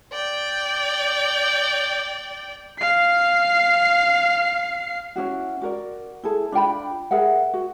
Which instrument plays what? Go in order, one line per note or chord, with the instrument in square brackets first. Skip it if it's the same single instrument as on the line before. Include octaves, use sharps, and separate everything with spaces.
[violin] D5 G5
[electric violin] F5 C7
[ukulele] C#4 D4 E4 F#4
F#4 A#4 D5
E4 G#4 A4
D4 F4 G5 B5
G#4 A#4 E5 F#5
F#4